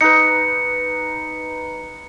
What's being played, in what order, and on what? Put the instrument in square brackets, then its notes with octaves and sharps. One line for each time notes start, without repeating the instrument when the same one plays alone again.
[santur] D#4 B4 [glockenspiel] C#7